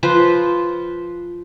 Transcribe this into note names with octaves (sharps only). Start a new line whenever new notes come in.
F3 B4 C5